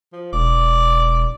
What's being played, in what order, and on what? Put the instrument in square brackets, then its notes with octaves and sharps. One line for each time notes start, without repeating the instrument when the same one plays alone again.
[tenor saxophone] F3
[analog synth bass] E1 [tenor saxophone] D5